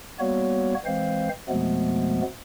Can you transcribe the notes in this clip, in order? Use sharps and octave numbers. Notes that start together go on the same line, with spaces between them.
G3 A#3 B3 F#4 C#5
E3 G#3 C4 C5 F5
F2 B2 F3 G#3 A3 B3